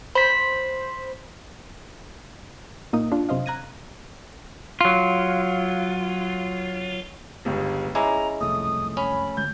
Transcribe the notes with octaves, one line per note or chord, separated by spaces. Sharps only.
C5 B5 B6
A#2 A#3 D#4 D#6
D4 F4
F#2 C3 C5 D#5 F5
F5 A#5 F#6 G#6 A#6 D#7
F#3 F4
G1 C#2 G2
G#3 C#4 E4 A#5 D6
F#1 C2 F2 A3 D#6
C#4 B5
D2 G#3 G6